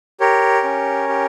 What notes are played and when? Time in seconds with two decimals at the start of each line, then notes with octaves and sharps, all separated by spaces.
0.20 G4 A#4 C#5
0.63 C#4
1.09 G4